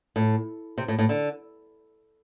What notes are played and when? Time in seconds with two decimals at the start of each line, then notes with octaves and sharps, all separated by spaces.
0.16 A2
0.78 C3
0.88 A2
0.99 A2
1.09 D3